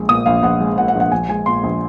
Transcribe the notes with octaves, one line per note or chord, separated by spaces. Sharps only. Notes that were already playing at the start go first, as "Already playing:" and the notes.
Already playing: A#1 G#3
A#2 D#6
A#1 F5
A#1 F#5
G#3
A#2 F#5
F#5
A#1
F#5
A#1 G#5
G#3 G#5
A#2 C6
A#1